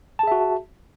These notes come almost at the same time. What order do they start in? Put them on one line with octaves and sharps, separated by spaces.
A5 G#4 E5 F#4